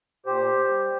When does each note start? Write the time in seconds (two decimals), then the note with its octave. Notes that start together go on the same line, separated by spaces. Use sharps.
0.26 A#2 G4 C5
0.68 G3